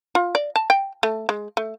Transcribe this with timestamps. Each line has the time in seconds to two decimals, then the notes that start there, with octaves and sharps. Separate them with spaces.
0.15 F4
0.35 D5
0.56 A5
0.70 G5
1.03 A3
1.29 G#3
1.57 A3